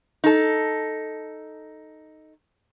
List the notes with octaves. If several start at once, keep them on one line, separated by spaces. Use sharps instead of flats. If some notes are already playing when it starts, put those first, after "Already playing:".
D#4 A4